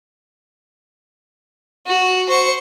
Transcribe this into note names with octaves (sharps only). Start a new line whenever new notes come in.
F#4
C5 C#6